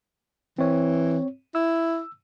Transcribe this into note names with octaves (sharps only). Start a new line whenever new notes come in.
E3 C4 C#5
E4 E6